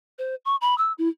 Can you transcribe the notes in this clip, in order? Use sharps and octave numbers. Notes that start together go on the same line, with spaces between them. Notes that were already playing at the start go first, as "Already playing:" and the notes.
C5
C#6
B5
E6
E4